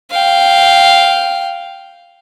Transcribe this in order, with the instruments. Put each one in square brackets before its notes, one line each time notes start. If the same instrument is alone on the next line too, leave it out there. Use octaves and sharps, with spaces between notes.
[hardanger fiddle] F5 G5